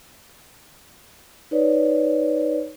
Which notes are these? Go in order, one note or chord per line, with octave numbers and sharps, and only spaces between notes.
D#4 B4 C#5 D5